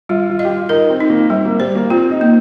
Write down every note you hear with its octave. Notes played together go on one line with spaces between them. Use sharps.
G3 F4
F4
D#5
G4
F4
D#4 A#4
C4
D#4
A#3
G3 C4
A#3
G3 C5
A#3
C4 F4
D#4
A#3